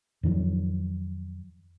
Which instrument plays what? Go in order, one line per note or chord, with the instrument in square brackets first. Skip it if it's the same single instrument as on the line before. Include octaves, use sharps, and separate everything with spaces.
[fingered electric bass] F2 D#3 F3 F#3